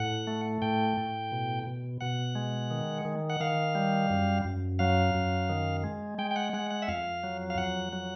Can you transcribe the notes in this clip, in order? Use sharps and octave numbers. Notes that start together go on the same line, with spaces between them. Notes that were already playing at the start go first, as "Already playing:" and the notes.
Already playing: A2 F#5
A3
A2 G5
A2
B2
B2
B2 F#5
G#3
D#3
D#3
F#5
D#3 F5
G3
F#2
F#2
F#3 F5
F#2
D#3
G#3
G#3 G5
G5
F#5
G#3 F#5
F#5
E5
F2 F5
F#3
F5
F2 F#5
F#3